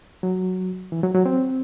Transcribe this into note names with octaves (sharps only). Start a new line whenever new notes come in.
F#3
E3
F#3
F#3
C4